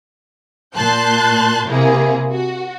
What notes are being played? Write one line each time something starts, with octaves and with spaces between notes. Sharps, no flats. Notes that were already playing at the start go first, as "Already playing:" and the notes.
A#2 A5 C6 F#6 G6
C3 A#3 E4 G#4
F#4